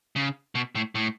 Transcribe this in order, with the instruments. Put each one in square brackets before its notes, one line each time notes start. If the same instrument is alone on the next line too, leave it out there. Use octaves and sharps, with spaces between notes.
[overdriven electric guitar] C#3
B2
A2
A2